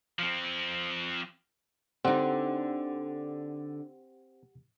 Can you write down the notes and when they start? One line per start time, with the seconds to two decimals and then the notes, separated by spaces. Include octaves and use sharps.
0.19 F3 C4
2.05 D3 C4 D#4 G4 F#5